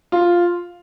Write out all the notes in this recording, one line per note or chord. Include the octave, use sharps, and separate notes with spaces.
F4